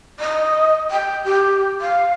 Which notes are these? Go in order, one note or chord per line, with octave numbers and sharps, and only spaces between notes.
D#5
G5
G4
F5